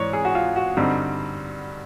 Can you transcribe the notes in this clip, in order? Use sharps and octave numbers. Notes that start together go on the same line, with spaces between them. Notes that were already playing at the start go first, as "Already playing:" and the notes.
Already playing: G#2 E3 C#5 D5
G#4
F#4
F4
F#4
G2 D3 G3 C4 D#4